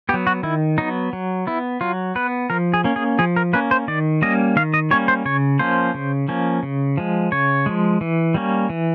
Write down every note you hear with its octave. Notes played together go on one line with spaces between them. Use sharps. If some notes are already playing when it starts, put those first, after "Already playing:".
F#3 B3 G4
F#4
D#3 E4
F#3 B3 D#4
F#3
B3 E4
F#3 F4
B3 B4
F3 A#4
G#4
A#3 C#4
G#4
F3 G#4
A#4
A#3 C#4 B4
C5
D#3 D5
G3 A#3 C#4 D#5
D#3 F5
D#5
G3 A#3 C#4 C#5
C5
C#3 C#5
F3 A#3 C#4 C5
C#3
F3 A#3 C#4
C#3
F3 G#3
C#3 C#5
F3 G#3
E3
G3 A#3 C#4
E3